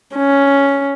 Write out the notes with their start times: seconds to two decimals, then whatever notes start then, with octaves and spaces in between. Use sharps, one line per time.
0.16 C#4